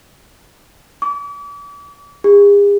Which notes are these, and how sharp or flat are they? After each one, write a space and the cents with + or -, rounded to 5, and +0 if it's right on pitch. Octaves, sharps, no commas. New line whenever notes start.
D6 -40
G#4 -45